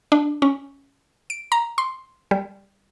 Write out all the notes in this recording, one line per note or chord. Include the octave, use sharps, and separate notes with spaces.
D4
C#4
D7
A#5
C6
G3